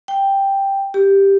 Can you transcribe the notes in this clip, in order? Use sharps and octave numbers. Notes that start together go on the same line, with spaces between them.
G5
G4